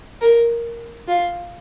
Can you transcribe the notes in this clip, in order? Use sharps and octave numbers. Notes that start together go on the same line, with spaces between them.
A#4
F4